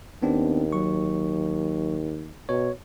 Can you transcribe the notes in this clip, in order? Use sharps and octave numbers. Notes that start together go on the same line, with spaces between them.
D#2 B3 C4 D4
F#3 C#6
B2 C#5